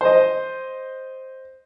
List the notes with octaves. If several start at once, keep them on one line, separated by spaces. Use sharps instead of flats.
C5 D#5